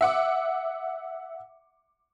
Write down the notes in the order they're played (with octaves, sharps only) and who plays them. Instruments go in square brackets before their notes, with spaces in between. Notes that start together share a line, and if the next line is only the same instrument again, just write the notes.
[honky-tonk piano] E5 F#5 D6